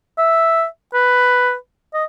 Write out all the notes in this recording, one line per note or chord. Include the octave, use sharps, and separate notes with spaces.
E5
B4
D#5